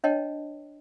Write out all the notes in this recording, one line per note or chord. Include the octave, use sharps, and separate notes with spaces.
D4 B4 C#5 D#5 G5 A5